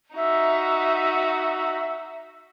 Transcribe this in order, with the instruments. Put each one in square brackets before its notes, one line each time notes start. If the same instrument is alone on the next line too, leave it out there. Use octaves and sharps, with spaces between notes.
[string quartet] D#4 F#4 [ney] E5